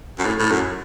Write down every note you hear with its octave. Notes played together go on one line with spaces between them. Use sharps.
F#2
A2
A2
F#2